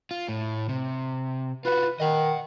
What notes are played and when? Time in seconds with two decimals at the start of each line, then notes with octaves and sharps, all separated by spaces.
0.11 F4
0.29 A2
0.69 C3
1.65 F4 F#4 B4
2.00 D#3 D#5 F#5